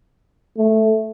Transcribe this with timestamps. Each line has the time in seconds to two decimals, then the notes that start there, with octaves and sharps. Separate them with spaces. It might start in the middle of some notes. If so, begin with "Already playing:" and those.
0.58 A3